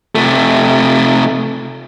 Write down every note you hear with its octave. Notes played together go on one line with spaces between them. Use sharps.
C3 A3